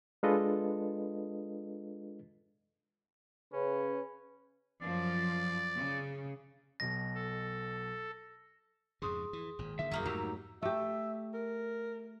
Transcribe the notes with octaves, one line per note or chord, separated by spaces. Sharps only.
G#3 D4 F4 A4 B4 D#5
C#3 C#4 B4
F#2 F3 D5
C#3
B1 B2 A#6
A4
F2 G#2 C#3 G#4 C6 D#6
E3
G#1 A#2
D3 D#3 A#3 E5
A#1 F#2 F#3 G3 A#3 D#4
F2 G#2 F#3 A3 D#4 G4 A#5 E6
A3 G4 E5
A#4